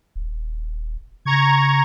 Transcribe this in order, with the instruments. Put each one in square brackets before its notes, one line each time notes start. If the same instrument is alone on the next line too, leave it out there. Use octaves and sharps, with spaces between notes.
[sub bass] D#1
[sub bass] C#3 [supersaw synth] A#5 C#6 G#6